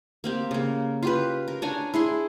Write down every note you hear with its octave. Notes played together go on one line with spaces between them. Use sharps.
A#3 C4 G4
C#3 A#3
F4 G4 B4
A#4
D4 C#5 G#5 A#5
E4 G#4 C6